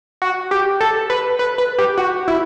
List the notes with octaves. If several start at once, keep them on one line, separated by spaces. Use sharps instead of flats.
F#4
G4
A4
B4
B4
B4
G4
F#4
E4